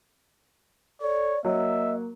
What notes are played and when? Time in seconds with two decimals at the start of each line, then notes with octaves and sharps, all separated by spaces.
1.01 A4 C#5 D5
1.45 F#3 A#3 D#5 E5